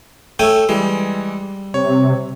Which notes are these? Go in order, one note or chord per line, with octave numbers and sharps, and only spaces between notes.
A3 C#4 G5 G#5 E6
E3 G3 G#3
C3 C#5